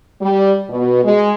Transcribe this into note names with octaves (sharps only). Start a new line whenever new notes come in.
G3
B2
G#3